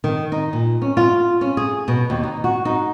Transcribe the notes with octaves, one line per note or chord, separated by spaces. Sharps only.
D#3
D#4
A#2
C#4
F4
C#4
G#4
B2
D#2
D#4
F#4
D#4